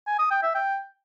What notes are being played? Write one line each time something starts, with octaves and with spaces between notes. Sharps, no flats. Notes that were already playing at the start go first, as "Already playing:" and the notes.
G#5
D#6
G5
E5
G5